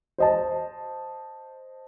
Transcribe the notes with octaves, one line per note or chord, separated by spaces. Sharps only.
C5 D#5 A5